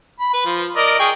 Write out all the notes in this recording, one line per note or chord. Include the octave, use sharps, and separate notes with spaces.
B5
B4
F3
A#4 D5 D#5
G#4 G5 C#6